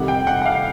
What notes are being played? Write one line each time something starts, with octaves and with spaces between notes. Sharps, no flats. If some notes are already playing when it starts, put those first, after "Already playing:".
Already playing: F2 C3 D#3 G3 F#5
G5
F#5
F#5
F5